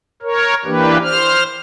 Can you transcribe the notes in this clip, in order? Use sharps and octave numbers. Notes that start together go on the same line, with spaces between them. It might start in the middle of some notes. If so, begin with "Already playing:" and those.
A#4 C#5
E3 A#3 D4 G4 B4
C5 F6